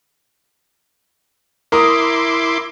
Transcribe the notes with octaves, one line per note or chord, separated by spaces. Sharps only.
E4 A#4 C6 D6 D#6